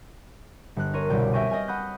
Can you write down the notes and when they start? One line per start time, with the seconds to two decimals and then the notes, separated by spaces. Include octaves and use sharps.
0.76 G1 F#6
0.93 A#4 C#5 C6 D#7
1.10 C2 B2 D5 G5
1.33 E5 G5 G#5 C#6 A#6 D#7
1.50 D#5 G5 G#5 F6
1.67 F#5 B5 D#6 F#6 G6 B6